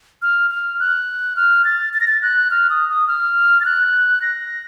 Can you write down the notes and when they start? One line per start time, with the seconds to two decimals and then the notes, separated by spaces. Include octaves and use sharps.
0.22 F6
0.51 F6
0.80 F#6
1.36 F6
1.65 A6
1.94 A6
2.01 A#6
2.08 A6
2.22 F#6
2.51 F6
2.70 D#6
2.89 D#6
3.08 F6
3.61 A6
3.65 F#6
4.22 A#6